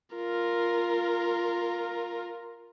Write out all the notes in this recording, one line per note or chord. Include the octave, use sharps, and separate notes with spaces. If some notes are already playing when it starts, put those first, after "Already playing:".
F4 A#4